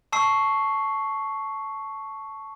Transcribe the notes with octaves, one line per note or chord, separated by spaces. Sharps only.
A5 C#6 E6 C7